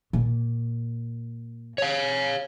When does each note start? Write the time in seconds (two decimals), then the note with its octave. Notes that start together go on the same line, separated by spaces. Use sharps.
0.13 A#2
1.78 C#5 F5